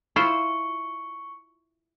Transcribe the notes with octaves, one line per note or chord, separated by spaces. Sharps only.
E4 F4 C5 C#6